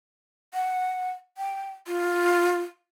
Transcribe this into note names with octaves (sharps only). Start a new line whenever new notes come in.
F#5
G5
F4